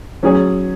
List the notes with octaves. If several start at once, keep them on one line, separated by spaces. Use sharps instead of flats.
F#3 C#4 G#4 C#5